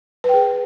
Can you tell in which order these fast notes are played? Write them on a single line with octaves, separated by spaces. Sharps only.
B4 G5 G#4